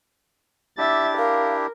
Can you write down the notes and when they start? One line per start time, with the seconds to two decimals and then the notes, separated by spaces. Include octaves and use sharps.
0.78 D4 E4 G4 E5 A6
1.18 A#4 F5